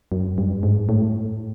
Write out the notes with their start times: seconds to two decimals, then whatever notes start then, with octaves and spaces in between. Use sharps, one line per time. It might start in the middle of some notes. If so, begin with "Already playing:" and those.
0.12 F#2
0.38 G2
0.63 G#2
0.89 A2